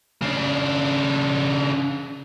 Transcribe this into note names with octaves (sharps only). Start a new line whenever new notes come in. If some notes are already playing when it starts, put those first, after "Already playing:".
C#3 D4